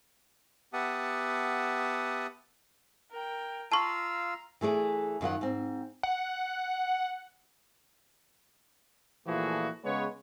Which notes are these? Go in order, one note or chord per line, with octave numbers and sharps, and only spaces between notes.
B3 G4 E5 F#5 A5 D#6
A#4 G5
F4 F5 A5 A#5 C#6 E6
E3 A3 G#4 D5
F#2 D#3 F4 F#5
G#2 C4
F#5
A#2 E3 F3 A3 F#4 G#4
C#3 G#3 B3 B4 C#5